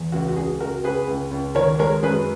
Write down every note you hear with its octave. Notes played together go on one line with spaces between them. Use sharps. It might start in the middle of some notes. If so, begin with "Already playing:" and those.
Already playing: E2
C#2 F#4
F#4
C#2 G#4
C#2 F#4 A#4
C#2 G#4 B4
C#2
C#2
D#3 A#4 C#5
G#3 A#4 C#5
F#2 G#4 B4